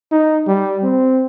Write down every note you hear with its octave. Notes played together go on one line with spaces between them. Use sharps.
D#4
G3
C4